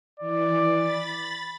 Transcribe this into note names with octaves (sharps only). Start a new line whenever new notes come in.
E3 D5
B5 A6